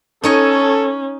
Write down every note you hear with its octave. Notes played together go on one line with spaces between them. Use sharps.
C#4 D#4 A4 C#5 D#5